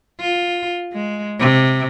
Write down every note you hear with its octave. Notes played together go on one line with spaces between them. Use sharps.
F4
G#3
C3